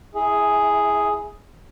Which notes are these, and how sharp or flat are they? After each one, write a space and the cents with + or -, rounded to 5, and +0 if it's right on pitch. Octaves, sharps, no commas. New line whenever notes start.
E4 -5 G#4 +0 E5 -30